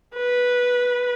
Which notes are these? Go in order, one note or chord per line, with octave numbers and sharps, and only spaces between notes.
B4